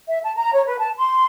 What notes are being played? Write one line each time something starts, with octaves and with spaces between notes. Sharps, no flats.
E5
A5
A#5
C#5
B4
A5
C6